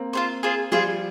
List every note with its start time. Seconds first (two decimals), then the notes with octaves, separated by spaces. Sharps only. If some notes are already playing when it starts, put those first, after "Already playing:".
Already playing: A#3 C4
0.13 F4 G#4 C5
0.43 F4 G#4 C5
0.72 F3 G3 F4 G#4 C5